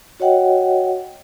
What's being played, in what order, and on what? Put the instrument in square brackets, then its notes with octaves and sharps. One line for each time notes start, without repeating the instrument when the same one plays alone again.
[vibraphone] F#4 C#5 D#5 F#5 G5